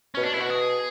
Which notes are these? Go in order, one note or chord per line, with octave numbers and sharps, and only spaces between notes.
B2 C#4
D4
E4
B2 F#4
G#4